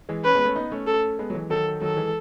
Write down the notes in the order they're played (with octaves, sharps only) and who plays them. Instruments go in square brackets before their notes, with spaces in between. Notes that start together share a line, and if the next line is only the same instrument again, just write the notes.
[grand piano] E3 G#3
[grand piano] C#4 [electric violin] B4
[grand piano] G#3 B3
A3 C#4
B3 D#4
A3 C#4
[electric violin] A4
[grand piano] G#3 B3
F#3
E3 G#3
[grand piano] D#3 F#3 [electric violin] A4
[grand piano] D#3 F#3 [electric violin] A4
[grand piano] E3 G#3